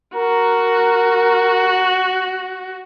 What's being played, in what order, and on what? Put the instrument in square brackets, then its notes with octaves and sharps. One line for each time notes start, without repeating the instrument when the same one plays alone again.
[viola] F#4 [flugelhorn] A#4